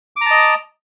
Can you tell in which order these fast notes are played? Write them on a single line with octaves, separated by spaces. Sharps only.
D6 A#5 A5 D#5